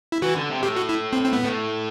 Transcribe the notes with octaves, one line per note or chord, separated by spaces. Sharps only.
E4
E3 F#4
D3
C3
A2 G4
F#4
E4
C4
C4
B3
A2